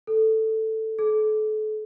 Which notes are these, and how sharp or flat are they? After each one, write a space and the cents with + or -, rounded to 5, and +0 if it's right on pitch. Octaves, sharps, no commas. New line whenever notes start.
A4 +5
A4 -35